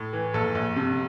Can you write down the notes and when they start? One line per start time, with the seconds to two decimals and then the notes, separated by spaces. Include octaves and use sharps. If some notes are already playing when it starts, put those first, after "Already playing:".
Already playing: A2
0.13 E3
0.34 A#1 A4
0.55 A#1
0.76 C3